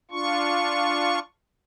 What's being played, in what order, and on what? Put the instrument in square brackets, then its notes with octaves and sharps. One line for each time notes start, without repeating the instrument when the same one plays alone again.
[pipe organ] D4 F4 C#6